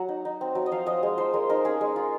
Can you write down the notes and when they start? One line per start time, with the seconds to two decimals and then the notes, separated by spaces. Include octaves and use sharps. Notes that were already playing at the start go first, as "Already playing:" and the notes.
Already playing: F#3 F#5
0.09 D#4
0.25 D#4
0.41 C4
0.55 F#3
0.66 D#5
0.72 F3 F5
0.86 F3 D#5
1.03 G#3
1.18 F3 C5
1.33 G#3 A#4
1.50 D#4 A#4
1.65 C#4 G#4
1.81 G#3
1.96 F4